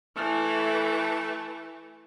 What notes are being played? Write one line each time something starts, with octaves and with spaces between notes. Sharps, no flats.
E3 A3